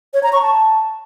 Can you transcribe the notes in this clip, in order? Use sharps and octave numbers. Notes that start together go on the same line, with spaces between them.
C#5
A#5
C#6
A5